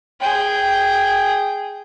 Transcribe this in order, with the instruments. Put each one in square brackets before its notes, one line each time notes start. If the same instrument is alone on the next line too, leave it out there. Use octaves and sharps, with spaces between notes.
[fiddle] G#4 G5